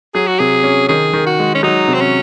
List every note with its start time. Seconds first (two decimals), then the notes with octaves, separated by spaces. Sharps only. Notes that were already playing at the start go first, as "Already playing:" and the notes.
0.15 F#3 G#4
0.27 F#4
0.39 C3 G#4
0.64 C#4
0.88 D#3 G#4
1.13 D#3
1.26 F#4
1.39 G#3
1.55 C#4
1.63 F#3 D#4
1.88 C3
1.94 C4
2.01 C#4